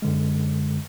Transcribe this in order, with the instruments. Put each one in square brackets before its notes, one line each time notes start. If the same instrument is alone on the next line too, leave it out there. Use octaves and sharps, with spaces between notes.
[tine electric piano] F#2 D3 G#3